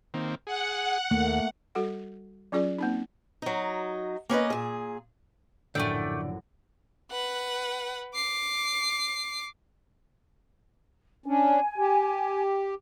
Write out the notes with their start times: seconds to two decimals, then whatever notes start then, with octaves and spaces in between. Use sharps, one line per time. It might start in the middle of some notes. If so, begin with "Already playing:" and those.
0.14 D#3 A#3 C4
0.47 G#4 F#5
1.11 D#2 A3 A#3
1.75 G3 F#4 A4 F#5
2.52 F#3 C#4 F4 G#4 D5
2.79 A#3 C4 D#4
3.42 F#3 D#4
4.29 A#3 C#4 B4 D#5
4.50 A#2 G#4
5.75 A#1 F#2 A2 D3 A3 D5 G5
7.11 B4 F#5
8.14 D6 C7
11.26 C#4 D4 G#5
11.78 G4